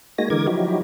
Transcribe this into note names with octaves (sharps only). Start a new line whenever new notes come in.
G#3 A#3 D#4 F#4 G#5 A#6
D3 E3 G#3 A#4 D6 G#6
F3 F#3 D#4 E4 F#4 G4